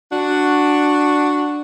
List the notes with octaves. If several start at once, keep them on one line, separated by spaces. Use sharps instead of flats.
D4 F#4